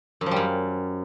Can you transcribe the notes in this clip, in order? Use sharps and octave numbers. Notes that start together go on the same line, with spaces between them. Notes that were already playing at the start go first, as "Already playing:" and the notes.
F#2
F3
G3
F#2